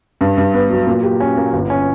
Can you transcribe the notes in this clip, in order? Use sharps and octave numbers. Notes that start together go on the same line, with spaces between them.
G2
G2
B3
F#3
A#2
G4
C#4
A#3
G1
C#4